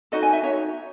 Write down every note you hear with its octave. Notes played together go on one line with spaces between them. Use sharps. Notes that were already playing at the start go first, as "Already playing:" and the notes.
D#4 F#4 A4 D#5
G#5
E5
D#4 F#4 C#5